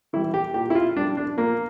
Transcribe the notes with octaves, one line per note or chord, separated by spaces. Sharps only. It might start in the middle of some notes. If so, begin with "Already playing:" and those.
E3 G3 E4
G4
A#2 G4
E4
F4
G3 D4
D4
A#2 A#3